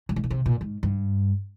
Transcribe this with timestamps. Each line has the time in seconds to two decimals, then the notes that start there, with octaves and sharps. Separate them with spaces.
0.09 G2
0.16 G#2
0.24 A#2
0.30 C3
0.46 A#2
0.61 G#2
0.83 G2